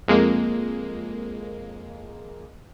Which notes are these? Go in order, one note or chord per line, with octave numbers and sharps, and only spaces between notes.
F2 G#3 A#3